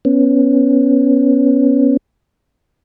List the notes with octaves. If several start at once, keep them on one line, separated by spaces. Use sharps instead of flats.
B3 C#4